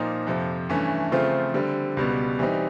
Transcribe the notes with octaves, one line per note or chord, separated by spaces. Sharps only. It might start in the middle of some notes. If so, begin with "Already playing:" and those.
Already playing: A#2 F3 A#3 D#4
F2 C3 F3
G2 E3 A3 C#4
C#3 F3 A3 C4 F4
D3 G3 C4
C#2 B2 G3 B3
E3 G3 C4 D#4